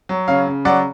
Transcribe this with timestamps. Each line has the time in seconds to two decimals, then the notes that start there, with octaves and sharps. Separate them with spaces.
0.09 F#3
0.28 C#3 C#5 F5
0.47 C#3
0.65 F#3 D5 F#5